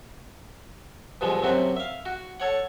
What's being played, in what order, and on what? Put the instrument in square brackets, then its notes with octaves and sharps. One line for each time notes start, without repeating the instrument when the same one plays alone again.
[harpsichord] G2 B2 D3 F3 G#3
F#2 C3 C4 F#4 E5
E5 F5
F#4
A4 C#5 F#5